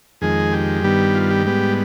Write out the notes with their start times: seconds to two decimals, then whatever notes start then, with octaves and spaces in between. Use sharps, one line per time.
0.21 F2 D#3 G#3 G#4
0.53 G4
0.83 G2 D#3 G3 B3
1.15 F4
1.31 G4
1.46 G#2 G3 B3